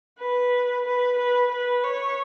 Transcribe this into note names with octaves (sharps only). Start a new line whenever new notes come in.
B4
B4
B4
B4
C#5